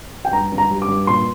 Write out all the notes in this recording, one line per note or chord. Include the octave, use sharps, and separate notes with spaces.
G5
G2 A#5
G2
A#5
G3
D6
G2
A#2 C6